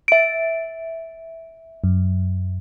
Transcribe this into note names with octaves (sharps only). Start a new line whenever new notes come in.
E5 D7
F#2